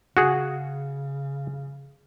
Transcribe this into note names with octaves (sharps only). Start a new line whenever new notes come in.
C#3 F#4 G#4